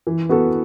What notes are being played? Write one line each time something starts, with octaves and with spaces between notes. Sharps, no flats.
E3
B3 F#4 A4